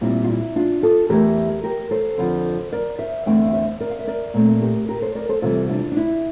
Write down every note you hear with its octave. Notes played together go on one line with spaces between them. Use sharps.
A#2 G3 C4 E4
F4
E4
D4 F4
F4 A4
E2 E3 A3 G4 A#4
G4 A#4
A4 C5
F2 D3 F3
A#4 D5
C5 E5
E2 D3 A3 C4 E5 G5
F5
C5 E5
A#4 D5
F5
E5
A#4 D5
A#2 A3 C4
G4 A#4
G4 A#4
A4 C5
A#4 D5
A4 C5
C3 E3 G3 F4 A4
D4 F4
D4
E4